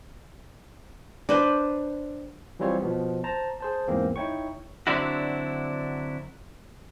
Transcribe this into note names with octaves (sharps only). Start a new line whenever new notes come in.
D4 B4 C5
E3 F#3 G3 C4 F4 C#5
B2 F3 B3
C5 A5 A#5
G#4 C5 A5
E2 G#2 E3 A#3 C4
D#4 E4 C#5 G5 C#6
D3 F#3 C4 D4 E4 F#4